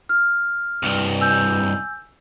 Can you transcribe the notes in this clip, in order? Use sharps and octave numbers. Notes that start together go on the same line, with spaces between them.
F6
C2 G2
G#5 E6 G6